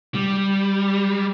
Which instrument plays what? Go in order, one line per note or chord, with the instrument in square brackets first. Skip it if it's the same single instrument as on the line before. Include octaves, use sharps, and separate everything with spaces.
[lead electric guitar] G3